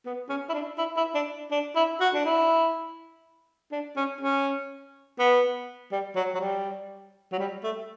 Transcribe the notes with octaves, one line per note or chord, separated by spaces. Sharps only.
B3
C#4
E4
D4
E4
E4
D4
D4
E4
F#4
D4
E4
D4
C#4
C#4
B3
G3
F#3
F#3
G3
F#3
G3
A3